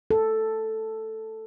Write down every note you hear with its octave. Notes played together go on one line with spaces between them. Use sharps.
A4